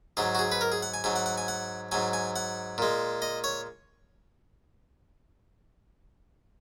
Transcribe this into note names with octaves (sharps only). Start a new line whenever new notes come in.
G#2 F#3 G#4
F#4
G#4
B4
A#4
G#4
F#5
G#5
G#2 F#3 G#5
F#5
F#5
G#5
F#5
G#2 F#3 G#5
G#5
F#5
A#2 G#3
D#5
C#5